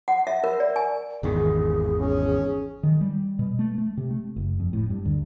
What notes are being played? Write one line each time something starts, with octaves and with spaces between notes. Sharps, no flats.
F#5
E5
A#4
D5
G#5
G#1 E2 D#3 G#4
C#4
D#3
G3
B2
A3
A3
C3
A3
F#1
F2
A2
G2
D2